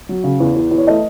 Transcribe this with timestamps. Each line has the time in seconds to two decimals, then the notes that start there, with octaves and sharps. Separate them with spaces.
0.09 F#3
0.24 C#3
0.40 E2
0.56 E2
0.71 E2
0.78 C#5
0.87 A3 D#5